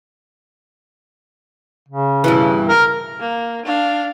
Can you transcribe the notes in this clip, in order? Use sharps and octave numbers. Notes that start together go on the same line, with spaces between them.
C#3
G2 B2 E3
A#4
A#3
D4 F5